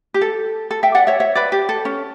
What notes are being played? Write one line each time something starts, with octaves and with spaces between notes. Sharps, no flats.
G4
A4
A4
E5 G5
D5 F#5
C#5 E5
C#5 E5
B4 D5
G4
A4
C#4